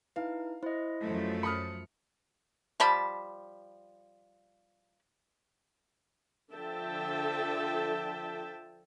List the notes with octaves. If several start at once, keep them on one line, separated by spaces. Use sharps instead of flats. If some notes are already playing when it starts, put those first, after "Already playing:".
D#4 E4 B4 F5
E4 C5 D#5
F#2 F3 A3
B5 D#6 F6 C#7
F3 G3 A5 B5
D3 F3 A4 E5 G5 A5